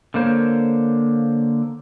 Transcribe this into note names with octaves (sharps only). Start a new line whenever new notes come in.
D3 A#3 C5 C#5